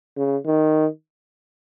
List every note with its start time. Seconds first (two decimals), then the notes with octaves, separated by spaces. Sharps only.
0.16 C#3
0.46 D#3